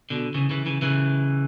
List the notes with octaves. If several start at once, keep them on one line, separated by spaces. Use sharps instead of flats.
B2 D3
C#3 E3
C#3 E3
C#3 E3
C#3 E3